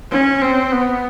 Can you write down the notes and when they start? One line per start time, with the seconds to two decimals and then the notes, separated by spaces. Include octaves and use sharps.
0.12 C#4
0.42 C4
0.72 B3